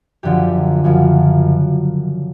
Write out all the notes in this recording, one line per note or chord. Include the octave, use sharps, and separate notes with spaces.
F#2 D3 F3 G4
F#2 C#3 F3